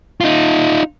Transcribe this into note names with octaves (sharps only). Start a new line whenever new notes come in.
D#4 F4